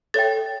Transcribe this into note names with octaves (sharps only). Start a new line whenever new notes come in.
A4 C#5 E5 G5 A6